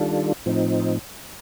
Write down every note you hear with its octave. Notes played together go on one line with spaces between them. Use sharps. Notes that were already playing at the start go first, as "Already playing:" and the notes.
Already playing: D#3 G3 D4 F4 A4
A2 F3 C4 D#4